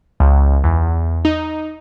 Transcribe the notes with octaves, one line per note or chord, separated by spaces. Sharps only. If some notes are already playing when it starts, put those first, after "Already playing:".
C#2
E2
D#4